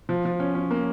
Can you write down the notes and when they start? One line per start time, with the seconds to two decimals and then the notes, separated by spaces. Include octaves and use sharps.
0.09 F3
0.25 F3
0.40 C#4
0.55 C#4
0.71 A#3